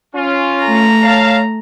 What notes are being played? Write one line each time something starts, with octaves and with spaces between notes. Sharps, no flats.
C#4 F4
A3 A#5
C#5 F5 A5